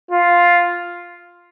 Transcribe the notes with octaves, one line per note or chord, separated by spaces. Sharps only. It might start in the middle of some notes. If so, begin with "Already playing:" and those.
F4